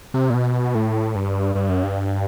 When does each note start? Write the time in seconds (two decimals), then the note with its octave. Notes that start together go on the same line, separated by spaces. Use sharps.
0.14 C3
0.30 A#2
0.34 B2
0.75 A2
1.15 G2
1.55 G2
1.69 F#2
1.83 G2